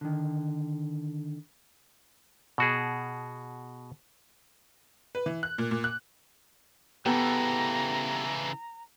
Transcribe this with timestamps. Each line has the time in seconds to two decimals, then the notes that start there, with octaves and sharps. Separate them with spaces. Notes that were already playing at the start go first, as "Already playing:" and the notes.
0.01 D3 D#3
2.58 B2 F#4 G#4
5.15 B4
5.26 E3
5.43 F#6
5.58 A#2
5.71 A#2
5.84 F#6
7.06 C#3 E3 B3 G4 A4 A#5